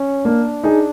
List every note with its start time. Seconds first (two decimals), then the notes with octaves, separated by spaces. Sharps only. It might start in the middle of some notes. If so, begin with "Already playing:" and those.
Already playing: C#4
0.25 A#3 D4
0.64 D#4 G#4